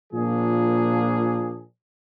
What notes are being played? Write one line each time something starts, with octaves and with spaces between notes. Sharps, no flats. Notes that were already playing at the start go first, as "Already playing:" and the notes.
A#2 F3 A#3 D4 G#4